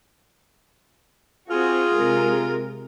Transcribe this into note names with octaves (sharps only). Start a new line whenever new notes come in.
C4 F4 F#4 G#4
C3 G#3 A#4